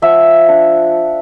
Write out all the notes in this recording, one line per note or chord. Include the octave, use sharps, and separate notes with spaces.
F3 E5 F#5
D4